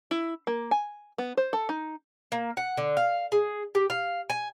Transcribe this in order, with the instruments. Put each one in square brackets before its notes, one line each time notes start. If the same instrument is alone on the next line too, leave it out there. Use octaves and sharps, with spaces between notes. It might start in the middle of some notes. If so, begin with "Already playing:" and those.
[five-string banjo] E4
A#3
G#5
B3
C5
A4
D#4
[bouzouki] A#3
F#5
D3
F5
G#4
G4
F5
G#5